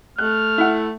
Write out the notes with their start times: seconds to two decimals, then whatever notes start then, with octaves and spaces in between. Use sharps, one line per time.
0.18 A3 F6 F#6
0.58 E4 F#5